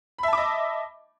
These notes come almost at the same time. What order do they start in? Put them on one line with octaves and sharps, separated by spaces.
B5 E5 A5 D6 D#5